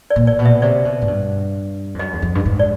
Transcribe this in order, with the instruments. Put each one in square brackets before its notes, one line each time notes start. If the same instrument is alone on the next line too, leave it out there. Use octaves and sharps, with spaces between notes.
[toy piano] D5
[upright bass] A#2
[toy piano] D5
[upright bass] B2
[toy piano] E5
[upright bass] C3 [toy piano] D5
[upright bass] B2
G#2
G2
F2
[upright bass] F#2 [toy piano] D#5
[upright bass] E2
F2
G2
G#2
[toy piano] D5